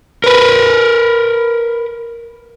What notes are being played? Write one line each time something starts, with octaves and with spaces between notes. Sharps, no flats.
A#4 B4